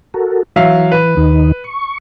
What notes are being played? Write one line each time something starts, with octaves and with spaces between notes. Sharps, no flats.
F#4 A4 A#4
E3 F#3 E5 F5
B4
D#2 D#3 D#4
C#6